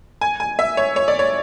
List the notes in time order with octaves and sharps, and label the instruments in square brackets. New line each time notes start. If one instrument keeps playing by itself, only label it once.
[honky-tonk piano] G#5
G#5
E5
C#5
C#5
D5
C#5